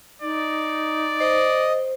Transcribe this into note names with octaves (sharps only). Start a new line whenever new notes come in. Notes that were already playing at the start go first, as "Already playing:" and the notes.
D#4 D5
C5 D#5